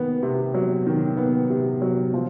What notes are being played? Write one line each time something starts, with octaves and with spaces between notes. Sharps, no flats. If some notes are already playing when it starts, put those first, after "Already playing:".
Already playing: D#3 B3
C3
F#3
D#3
B3
C3
F#3
F3